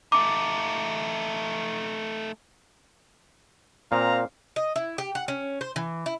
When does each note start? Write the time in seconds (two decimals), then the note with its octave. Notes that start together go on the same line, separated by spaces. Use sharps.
0.12 A3 D#4 D6
3.92 A#2 C4 F5 A#5
4.56 D#5
4.76 E4
4.98 G4
5.15 F#5
5.28 C#4
5.61 C5
5.76 E3
6.06 E4